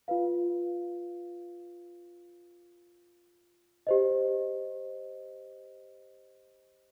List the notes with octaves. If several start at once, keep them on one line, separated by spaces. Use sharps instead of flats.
F4 B4 F5
G4 C5 D#5